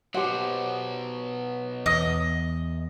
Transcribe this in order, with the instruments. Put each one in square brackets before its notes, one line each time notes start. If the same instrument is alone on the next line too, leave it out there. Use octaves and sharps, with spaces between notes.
[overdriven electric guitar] B2 F#3 [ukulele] G4 C5 F#5
[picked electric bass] E2 [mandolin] D#5